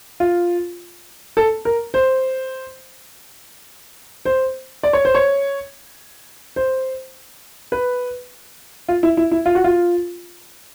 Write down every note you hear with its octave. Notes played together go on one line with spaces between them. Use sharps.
F4
A4
A#4
C5
C5
D5
C#5
C5
C#5
C5
B4
F4
E4
E4
E4
F4
F#4
F4